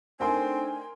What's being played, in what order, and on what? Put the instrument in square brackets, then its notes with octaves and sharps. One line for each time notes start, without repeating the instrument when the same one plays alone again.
[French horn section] A3 D4 D#4 [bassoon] C4 [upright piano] A#4 G5 C6 [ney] G#5